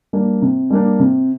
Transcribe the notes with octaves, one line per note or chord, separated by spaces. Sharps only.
G3 A#3 D4
C3
G3 A#3 D4
C3